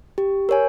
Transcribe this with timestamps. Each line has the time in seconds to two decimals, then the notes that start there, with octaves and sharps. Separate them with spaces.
0.18 G4
0.49 A#4 C#5 G#5